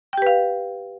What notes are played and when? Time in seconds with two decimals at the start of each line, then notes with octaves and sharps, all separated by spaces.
0.13 G5
0.18 G4
0.22 B4
0.27 F5